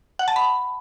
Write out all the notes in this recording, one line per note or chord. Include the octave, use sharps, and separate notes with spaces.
F#5
A5
B5